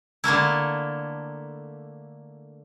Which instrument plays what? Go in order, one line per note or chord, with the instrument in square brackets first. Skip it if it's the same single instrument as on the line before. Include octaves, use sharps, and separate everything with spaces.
[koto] D3 A3 A#3 E4